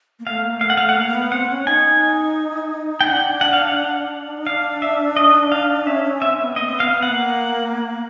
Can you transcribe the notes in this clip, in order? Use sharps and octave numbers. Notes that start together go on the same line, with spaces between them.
A#3
A3 F5
A#3
A3 F5
F#5
A3 F5
F#5
A#3 F5
A#3
B3
C4 F#5
C#4
D#4 G#5
G5
D4 F#5
F#5
F5
F#5
D#4
D4 F5
E5
D#5
F5
C#4 E5
C#4
C4 E5
B3
A#3 D#5
C4
B3
F5
B3
F#5
A#3